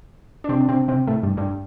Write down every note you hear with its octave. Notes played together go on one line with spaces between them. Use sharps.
D4
C3 C4
D4
C3 C4
C3 C4
A2 A3
G2 G3
G2 G3